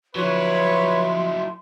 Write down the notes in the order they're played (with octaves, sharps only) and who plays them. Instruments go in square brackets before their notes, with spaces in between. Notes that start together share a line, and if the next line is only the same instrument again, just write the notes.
[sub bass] F3 [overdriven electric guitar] F#3 E4 [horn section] B4 C#5 [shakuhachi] C6